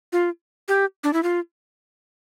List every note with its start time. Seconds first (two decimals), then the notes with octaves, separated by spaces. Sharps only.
0.13 F4
0.68 G4
1.04 D4
1.13 E4
1.23 F4